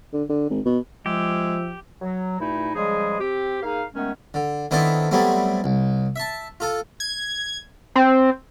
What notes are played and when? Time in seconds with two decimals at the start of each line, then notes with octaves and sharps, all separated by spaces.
0.13 D3
0.29 D3
0.50 G#1
0.65 B2
1.06 F3 G#3 G4 E5
2.02 F#3
2.40 G2 A#2 A3 D#4 E4
2.75 C#3 F3 G3 G#3 G#4
3.20 C4 G4
3.63 A#3 D#4 G#4 F5
3.95 D#3 G#3 A3 B3 C#4
4.34 D3
4.71 D#3 B3 C4 D4 E4 A4
5.11 F#3 G3 A3 B3 C4
5.64 C2
6.16 E5 A5
6.60 F4 A4
7.00 G#6
7.96 C4